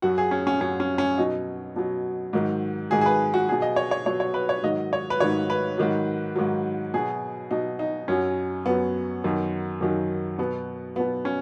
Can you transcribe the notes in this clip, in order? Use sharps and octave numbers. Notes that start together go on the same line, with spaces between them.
F#2 F#3 F#4
G#4
C#4
C#4
F#2 F#3 C#4
C#4
C#4
B2 F#3 D#4
B2 F#3
G#2 D#3 F#3
G#2 D#3 F#3 G#4
G#4
B4
F#4
B2 F#3 G#4
D#5
C#5
C#5
B2 F#3 C#5
C#5
B4
C#5
G#2 D#3 F#3 D#5
C#5
B4
G#2 D#3 F#3 C#5
B4
G#2 D#3 F#3
G#2 D#3 F#3
B2 F#3 G#4
B2 F#3 D#4
D#4
F#2 F#3 C#4
F#2 F#3 B3
F#2 D#3 F#3
F#2 D#3 F#3
B2 F#3 B3
B2 F#3 B3
C#4